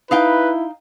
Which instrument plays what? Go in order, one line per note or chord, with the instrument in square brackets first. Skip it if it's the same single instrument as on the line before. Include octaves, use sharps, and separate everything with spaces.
[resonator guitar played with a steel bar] D#4 F5 G5 [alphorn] E4 [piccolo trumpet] B4